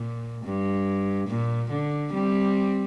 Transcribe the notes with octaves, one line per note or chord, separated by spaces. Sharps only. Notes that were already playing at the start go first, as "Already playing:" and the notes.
Already playing: A#2
G2
A#2
D3
G3 C4